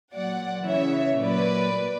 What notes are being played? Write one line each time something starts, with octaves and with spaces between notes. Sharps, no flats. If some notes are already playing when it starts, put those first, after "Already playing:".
A#2 F#3 D5 F#5
C#3 E3 C#5 E5
A#2 F#3 B4 D5